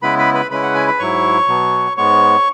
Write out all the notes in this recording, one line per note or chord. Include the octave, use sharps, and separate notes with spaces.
C#3 G#3 B3 E4 B4 B5
B4 B5
B4 B5
C#3 G#3 C#4 E4 B4 B5
F#5
G#5
B5
G#2 F#3 E4 C#5 C#6
B2 F#3 B3
G#2 G#3 B3 C#5 C#6